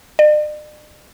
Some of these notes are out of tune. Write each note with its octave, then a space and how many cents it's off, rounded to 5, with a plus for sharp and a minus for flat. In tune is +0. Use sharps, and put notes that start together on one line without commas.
D5 +45